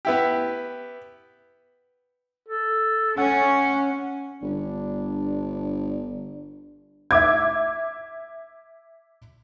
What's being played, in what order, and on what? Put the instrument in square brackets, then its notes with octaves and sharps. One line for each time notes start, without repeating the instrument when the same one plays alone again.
[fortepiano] B3 E4 G4
[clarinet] A4
[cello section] C#4 [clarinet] F#5
[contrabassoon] G1 [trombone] D4
[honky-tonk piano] E5 D6 G#6